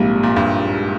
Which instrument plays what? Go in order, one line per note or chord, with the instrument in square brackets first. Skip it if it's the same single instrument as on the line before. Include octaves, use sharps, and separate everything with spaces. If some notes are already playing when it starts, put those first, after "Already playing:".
Already playing: [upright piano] A#1 G#2 G3 A#3 [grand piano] C3
[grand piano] A#2
G2